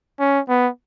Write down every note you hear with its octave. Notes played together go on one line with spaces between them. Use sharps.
C#4
B3